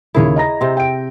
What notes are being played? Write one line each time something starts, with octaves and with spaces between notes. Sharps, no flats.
D#2 C#3 E4 G#4 A#4 C#5
D#5 A#5 A#6
C3 C4
G5 D7